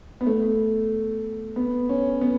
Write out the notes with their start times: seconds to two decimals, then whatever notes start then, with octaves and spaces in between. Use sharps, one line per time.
0.21 B3
0.27 A3
1.56 B3
1.89 C#4
2.21 B3